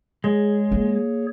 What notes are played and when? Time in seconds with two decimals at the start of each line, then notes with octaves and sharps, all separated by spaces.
0.24 G#3 G#4 C#5
0.72 A#3